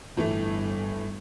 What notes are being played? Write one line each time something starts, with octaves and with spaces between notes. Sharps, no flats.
G1 A2 E3 A3